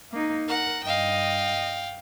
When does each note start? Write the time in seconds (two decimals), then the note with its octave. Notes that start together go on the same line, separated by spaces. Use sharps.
0.12 A#3 D#4
0.48 A#4 F#5
0.83 G2 D#5 F5 G5